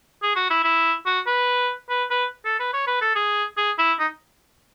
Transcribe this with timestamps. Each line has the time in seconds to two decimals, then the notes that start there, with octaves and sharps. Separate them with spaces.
0.22 G#4
0.36 F#4
0.50 E4
0.64 E4
1.06 F#4
1.27 B4
1.89 B4
2.11 B4
2.45 A4
2.59 B4
2.73 C#5
2.87 B4
3.01 A4
3.15 G#4
3.57 G#4
3.78 E4
3.99 D#4